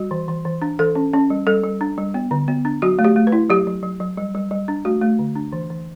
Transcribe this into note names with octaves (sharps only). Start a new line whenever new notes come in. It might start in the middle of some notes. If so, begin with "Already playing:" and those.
Already playing: G3 F#4
E3
E3
E3
D4
E3 A4
C#4
C#4
G3
G3 A4
G3
D4
G3
B3
D3
B3
D4
F#3 F#4
A3
G4
A3
B4
E4
F#3 G4
F#3
F#3
F#3
G3
G3
G3
D4
A3 F#4
A3
D3
D4
E3
E3